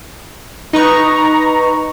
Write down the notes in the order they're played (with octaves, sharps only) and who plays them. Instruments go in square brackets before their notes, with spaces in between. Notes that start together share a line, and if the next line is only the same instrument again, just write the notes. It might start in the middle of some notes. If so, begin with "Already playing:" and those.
[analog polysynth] D#4 B4 C#6 [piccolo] A#5